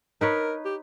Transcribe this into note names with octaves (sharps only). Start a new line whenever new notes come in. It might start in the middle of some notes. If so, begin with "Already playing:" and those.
D#4 A#4 B4 C#5
G4